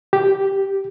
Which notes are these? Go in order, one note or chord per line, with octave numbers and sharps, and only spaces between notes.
G4